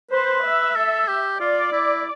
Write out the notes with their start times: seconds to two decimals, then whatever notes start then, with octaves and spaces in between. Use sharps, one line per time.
0.11 B4 C5
0.44 E5
0.75 A4
1.08 G4
1.40 F4 D5
1.72 E4